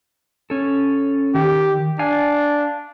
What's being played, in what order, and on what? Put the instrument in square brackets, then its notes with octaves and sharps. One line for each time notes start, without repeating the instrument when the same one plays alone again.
[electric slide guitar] C#4 A4
[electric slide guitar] D#3 [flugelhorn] G4
[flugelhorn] D4 [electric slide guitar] D5 F5 G#5